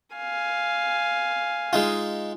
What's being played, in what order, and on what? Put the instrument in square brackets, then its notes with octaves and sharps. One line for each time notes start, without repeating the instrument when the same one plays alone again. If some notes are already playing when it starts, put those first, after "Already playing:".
[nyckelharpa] F5 G#5
[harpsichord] G#3 D#4 F4